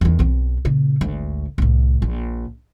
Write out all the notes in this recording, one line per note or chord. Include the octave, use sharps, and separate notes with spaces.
E2 D#3
B1 C4
A#2 C#3
G#1 D2
C2 A2
A#1